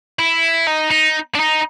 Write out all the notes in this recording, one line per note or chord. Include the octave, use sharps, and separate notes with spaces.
E4
D#4
D#4
D4
D#4